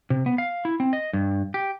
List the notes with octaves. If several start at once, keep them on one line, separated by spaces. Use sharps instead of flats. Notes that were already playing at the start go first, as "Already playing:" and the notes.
C3
B3
F5
E4
C4
D#5
G2
G4